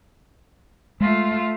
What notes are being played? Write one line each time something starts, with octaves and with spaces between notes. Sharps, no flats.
G#3 A3 F4